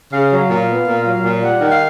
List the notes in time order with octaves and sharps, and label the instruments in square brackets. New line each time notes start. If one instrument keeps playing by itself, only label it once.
[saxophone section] C#3 F5
F#3
A#2
B3
A#2
F#3
A#2
G3 F#5
D#3
F5